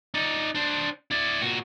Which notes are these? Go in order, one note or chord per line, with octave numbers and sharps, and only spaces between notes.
D#4 D5
D4 C5
E4 D5
A#2 F#4